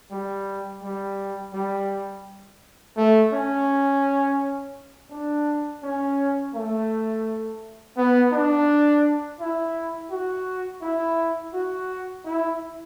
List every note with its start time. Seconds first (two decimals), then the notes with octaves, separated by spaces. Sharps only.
0.12 G3
0.83 G3
1.54 G3
2.97 A3
3.33 C#4
5.11 D4
5.83 C#4
6.55 A3
7.97 B3
8.32 D4
9.40 E4
10.10 F#4
10.82 E4
11.54 F#4
12.25 E4